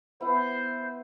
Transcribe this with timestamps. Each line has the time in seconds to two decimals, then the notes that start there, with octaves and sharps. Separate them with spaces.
0.21 B3 E4 C5 F#5